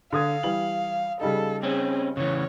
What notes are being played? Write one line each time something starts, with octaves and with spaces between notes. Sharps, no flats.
D3 F5 D#6 G#6
E3 G3 F#7
C#3 G3 D#4 A4
C4 C#4 G#4
C#3 E3 C#5